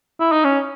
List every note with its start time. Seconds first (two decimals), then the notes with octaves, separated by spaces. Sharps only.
0.20 E4
0.32 D#4
0.44 C#4